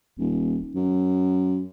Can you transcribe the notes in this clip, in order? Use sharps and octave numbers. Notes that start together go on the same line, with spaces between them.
D#1
F#2